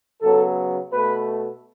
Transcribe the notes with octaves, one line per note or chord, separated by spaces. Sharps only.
C#3 F#3 B3 A4
B2 A3 B4